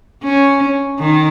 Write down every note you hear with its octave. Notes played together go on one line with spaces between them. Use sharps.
C#4
D#3